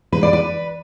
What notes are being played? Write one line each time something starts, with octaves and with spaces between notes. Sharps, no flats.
B4
D5
B4